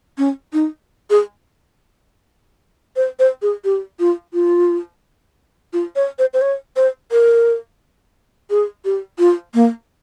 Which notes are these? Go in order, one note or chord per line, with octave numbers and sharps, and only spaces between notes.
C#4
D#4
G#4
C5
C5
G#4
G4
F4
F4
F4
C#5
C5
C5
C#5
C5
A#4
G#4
G4
F4
A#3